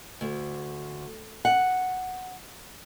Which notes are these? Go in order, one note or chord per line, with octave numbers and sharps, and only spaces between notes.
D2
F#5